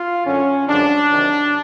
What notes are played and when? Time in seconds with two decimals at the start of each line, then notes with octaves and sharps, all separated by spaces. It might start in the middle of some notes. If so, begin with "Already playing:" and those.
Already playing: F4
0.26 F#2 D3 F#3 C#4
0.68 F#2 D3 F3 G#3 D4
1.11 C3 D#3 F#3